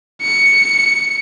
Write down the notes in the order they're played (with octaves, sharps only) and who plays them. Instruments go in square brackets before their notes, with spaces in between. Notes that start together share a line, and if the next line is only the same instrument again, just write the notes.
[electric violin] C#7